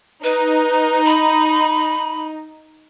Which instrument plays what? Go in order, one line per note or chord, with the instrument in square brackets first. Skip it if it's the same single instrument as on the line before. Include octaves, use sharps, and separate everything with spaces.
[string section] D#4 [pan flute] B4
[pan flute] B5